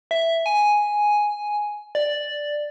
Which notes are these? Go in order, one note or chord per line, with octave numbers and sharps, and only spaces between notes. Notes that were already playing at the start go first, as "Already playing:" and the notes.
E5
G#5
D5